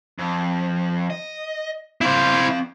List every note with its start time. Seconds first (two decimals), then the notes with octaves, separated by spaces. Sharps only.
0.19 F2
1.10 D#5
2.01 C4 E4 C5 F5